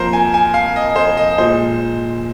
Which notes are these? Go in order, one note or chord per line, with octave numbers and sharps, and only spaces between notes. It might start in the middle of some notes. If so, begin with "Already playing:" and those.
Already playing: F2 F3 A#3 A#4 C5
G#5
G#5
F5
D#5
C5
D#5
A#2 G#3 C5